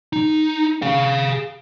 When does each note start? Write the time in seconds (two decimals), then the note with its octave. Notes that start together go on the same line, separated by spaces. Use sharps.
0.13 D#4
0.82 G#4 F5